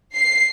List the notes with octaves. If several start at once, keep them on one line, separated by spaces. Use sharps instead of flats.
C7